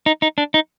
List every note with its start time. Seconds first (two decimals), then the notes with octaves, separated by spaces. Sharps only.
0.06 D#4
0.22 D#4
0.38 D4
0.54 D#4